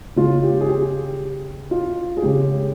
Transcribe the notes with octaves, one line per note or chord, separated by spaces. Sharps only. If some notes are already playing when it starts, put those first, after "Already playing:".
C#3 G#3 F4
G4
G#4
G4
F4
G#4
C#3 G#3 G4